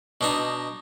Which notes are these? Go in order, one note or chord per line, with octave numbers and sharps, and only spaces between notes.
B2 D4 D#4